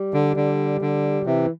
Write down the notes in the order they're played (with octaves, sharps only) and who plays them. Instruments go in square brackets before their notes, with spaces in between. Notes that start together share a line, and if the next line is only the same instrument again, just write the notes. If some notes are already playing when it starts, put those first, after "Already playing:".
Already playing: [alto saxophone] G3
[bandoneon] D3
D3
D3
[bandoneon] C3 [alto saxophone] E3